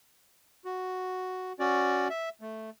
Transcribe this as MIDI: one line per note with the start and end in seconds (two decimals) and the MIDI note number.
0.65 1.53 66
1.59 2.08 61
1.59 2.08 66
1.59 2.08 74
2.10 2.29 76
2.41 2.70 57